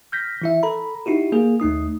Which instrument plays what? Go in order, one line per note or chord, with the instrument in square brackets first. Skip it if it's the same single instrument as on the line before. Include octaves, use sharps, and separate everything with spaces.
[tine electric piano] F6 G6 A#6 B6
E3 E4 E5
A4 A#5 B5
D#4 E4 F#4 G4
A#3 G#4
D#2 A3 D#4 D#6